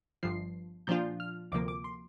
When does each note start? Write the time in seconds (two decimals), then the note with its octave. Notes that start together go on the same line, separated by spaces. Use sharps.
0.23 G1 G2 F3 C7
0.87 A#2 F3 D4 F4 G6
1.20 F6
1.52 D2 C3 F3 A#3 D6
1.68 D6
1.84 C6